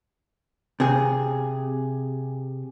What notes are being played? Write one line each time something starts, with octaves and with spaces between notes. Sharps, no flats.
C3 G#4